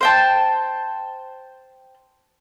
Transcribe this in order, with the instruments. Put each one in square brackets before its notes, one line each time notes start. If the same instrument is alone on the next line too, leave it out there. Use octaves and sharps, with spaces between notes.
[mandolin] C5 G5 A5